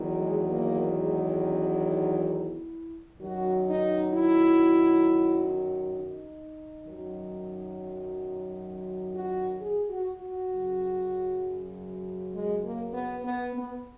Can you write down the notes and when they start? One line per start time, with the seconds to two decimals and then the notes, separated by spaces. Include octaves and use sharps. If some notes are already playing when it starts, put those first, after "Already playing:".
Already playing: E2 D#3 F#3
0.18 G#3
0.48 A#3
0.94 G#3
1.39 C#4
1.84 D#4
2.30 E4
3.21 F#2 D#3 F#3 F#4
3.66 D#4
4.12 E4
5.95 D#4
6.86 F#2 D#3 F#3
9.14 F#4
9.59 G#4
9.90 F#4
10.20 F#4
10.50 F#2 C#3 F#3
12.33 G#3
12.62 A#3
12.93 B3
13.24 B3
13.53 B3